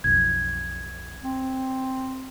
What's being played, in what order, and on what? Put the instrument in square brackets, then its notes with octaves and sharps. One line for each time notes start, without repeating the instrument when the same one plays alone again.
[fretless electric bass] B1 F2 [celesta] G#6
[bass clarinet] C4